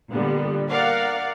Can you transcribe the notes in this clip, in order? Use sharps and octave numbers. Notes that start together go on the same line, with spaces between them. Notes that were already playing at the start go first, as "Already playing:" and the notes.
A#2 D3 G3 B3
A#4 D5 F5 F#5